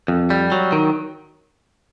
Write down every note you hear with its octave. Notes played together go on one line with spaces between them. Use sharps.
F2
G3
F#3
D#3